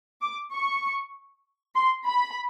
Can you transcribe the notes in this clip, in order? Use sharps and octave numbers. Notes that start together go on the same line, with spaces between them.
D6
C#6
C6
B5